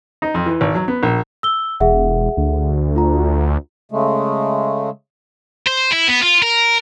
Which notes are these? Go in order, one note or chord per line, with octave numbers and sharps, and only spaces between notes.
D#4
F2
E3
G#1
F#3
B3
A#1
E6 G7
E1 G#4 E5 F#5
D2
F4 A#5
C#3 G#3 A3
C5
E4
B3
F4
A#4